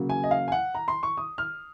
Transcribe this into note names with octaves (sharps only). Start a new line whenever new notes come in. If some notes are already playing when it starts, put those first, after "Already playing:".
Already playing: C#3 F#3 A#3
G#5
D#5
F5
G#5
F#5
A#5
C6
C#6
D#6
F6